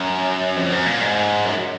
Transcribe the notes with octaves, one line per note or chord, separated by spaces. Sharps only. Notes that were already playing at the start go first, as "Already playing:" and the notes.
Already playing: F#2
F2
F#2
A#2
G#2
F#2